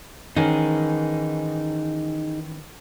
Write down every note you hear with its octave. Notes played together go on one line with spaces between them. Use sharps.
D#3 E3 C#4 D#4 G#4